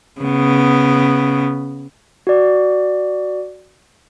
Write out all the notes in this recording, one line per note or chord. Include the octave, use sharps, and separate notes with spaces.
C#3 B3
F#4 D5